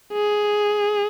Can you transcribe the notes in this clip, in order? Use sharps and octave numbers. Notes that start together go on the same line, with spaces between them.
G#4